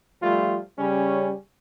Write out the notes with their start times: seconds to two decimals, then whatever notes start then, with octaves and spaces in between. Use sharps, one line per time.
0.22 F3 G3 A3 F4
0.77 C#3 G3 C#4